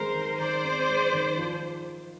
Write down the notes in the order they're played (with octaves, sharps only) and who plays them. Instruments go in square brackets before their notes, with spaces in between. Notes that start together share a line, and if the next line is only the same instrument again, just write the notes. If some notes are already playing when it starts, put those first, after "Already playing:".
Already playing: [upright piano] D#3 G#3 C4 [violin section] A#4 C5
[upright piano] D#3
[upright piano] D#3 [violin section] C5 D5
[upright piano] C4
G#3
D#3
F3